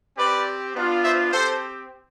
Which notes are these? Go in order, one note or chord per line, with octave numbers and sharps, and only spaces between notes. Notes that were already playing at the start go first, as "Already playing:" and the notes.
C4 G4 B4 D5
B3 D4 F4
C5 E5
C4 G4 A4 C5